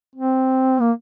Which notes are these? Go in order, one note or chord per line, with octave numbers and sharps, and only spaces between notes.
C4
A#3